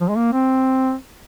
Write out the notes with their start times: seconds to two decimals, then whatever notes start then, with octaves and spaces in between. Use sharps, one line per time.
0.01 F3
0.09 G#3
0.16 A#3
0.33 C4